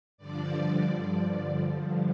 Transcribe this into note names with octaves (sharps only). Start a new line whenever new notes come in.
G2 D3 F3 D5